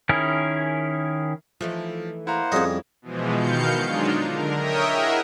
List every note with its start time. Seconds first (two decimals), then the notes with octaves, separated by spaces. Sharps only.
0.09 D#3 C#4 E4 G#4 A#4
1.61 E3 F3 A3 D#4
2.27 A#3 E4 C5 F#5 A#5
2.52 F2 G3 C#4 G#4 D#5
3.02 B2 E3 F3 G#3
3.35 B2 D#3 F5 G6 C#7
3.84 F#3 G#3 D4 D#4 F4
4.25 D3 A#4
4.57 A#4 C#5 D#5 E5 G5 D#6
4.89 E4 G#4 A#4 E5 F#5